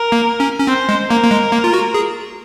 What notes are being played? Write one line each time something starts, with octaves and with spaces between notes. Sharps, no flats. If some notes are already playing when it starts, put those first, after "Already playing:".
Already playing: A#4
A#3
C#4
C#4
C4 C5
G#3
A#3 A#4
A#3
G#3
A#3
F4
F#4
G#4